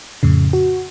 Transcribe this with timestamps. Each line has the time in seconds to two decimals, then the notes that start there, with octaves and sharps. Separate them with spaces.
0.23 F2 A2 C#3
0.53 F#4